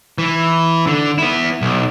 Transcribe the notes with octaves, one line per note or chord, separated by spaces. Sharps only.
E3
D3
B3 E4
B1